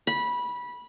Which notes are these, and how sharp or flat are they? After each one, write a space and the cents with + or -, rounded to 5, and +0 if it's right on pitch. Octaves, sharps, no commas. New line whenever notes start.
B5 -15